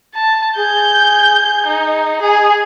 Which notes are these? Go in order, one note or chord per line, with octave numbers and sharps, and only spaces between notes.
A5
G#4 G6
D#4
G#4 G#5